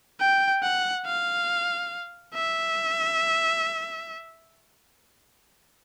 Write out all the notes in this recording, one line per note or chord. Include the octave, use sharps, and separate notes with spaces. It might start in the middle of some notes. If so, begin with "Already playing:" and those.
G5
F#5
F5
E5